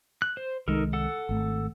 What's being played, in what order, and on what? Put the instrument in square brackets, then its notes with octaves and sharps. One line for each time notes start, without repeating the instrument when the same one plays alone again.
[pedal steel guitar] F#6
C5
[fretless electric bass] C2 D#3 G#3 [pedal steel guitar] D#4 A4 A#4
[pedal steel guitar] A4 F#5
[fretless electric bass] G#1 A3